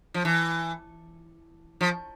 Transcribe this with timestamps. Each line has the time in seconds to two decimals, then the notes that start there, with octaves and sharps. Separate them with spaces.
0.14 F3
0.25 E3
1.81 F3